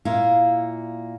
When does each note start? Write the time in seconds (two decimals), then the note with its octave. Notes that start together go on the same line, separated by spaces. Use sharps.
0.05 A#2 A#3 E4 F5